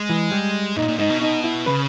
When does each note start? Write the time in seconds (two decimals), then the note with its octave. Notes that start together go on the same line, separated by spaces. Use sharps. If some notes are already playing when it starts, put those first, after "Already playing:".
Already playing: G#3
0.09 E3
0.32 G3
0.77 A#2 D#4
0.88 A#2
0.99 G#2 D#4
1.10 B2
1.21 D#4
1.44 E4
1.66 C#3 B4